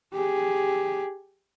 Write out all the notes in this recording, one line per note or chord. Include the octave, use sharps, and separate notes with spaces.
G4 G#4